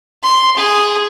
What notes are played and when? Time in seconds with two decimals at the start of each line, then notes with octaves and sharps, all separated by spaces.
0.23 C6
0.57 G#4